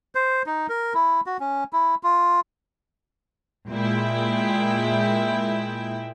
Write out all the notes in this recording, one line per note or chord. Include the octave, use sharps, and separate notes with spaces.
C5
D#4
A#4
E4
F#4
C#4
E4
F4
A#2 G#3 E4 G5